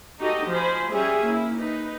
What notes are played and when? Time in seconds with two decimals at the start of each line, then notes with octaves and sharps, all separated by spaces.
0.18 D#4 F#4 G4 A4 D#5
0.48 F3 C5 G#5 B5
0.92 G3 C#4 G4 G#4 E5 G#5
1.25 A#3 E4
1.58 D#4 B4